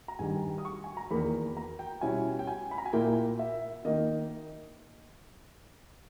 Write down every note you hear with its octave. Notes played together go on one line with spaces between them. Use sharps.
A#5
G2 D#3 G3 G#5
D#6
C#6
G#5
A#5
E2 D#3 A#3 B5
A#5
G5
B2 G3 C#4 E4 G#5
G5
G#5
B5
A#5
G#5
A#2 A#3 E4 G5
E5
D#3 A#3 D#4 D#5